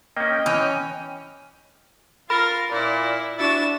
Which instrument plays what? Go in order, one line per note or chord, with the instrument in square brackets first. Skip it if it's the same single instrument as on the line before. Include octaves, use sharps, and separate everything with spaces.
[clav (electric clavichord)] A#3 C#4 [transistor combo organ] D#5 G5
[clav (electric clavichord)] E3 [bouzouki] C#4
[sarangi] F4 [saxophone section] A#4 [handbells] B5 [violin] A6
[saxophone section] A#2 [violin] E4 [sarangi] D5
[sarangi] D4 [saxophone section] E4 F#4 [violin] A6 E7